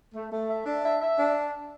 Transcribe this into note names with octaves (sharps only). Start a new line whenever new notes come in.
A3
A3
E5
D4
E5
E5
D4